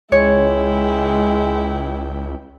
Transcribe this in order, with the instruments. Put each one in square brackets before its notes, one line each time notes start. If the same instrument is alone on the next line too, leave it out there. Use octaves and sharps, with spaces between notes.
[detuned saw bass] C#2 [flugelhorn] G#3 [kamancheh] E4 G5 [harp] C#5